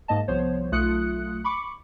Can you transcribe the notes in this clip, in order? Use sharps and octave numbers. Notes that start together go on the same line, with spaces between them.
G#2 A#3 D#5 A5
C2 F3 B3 C5 C#5
B1 A3 F4 D#6 F#6 C#7
B5 C#6 D6 C#7